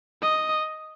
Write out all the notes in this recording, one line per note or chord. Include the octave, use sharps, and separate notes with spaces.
D#5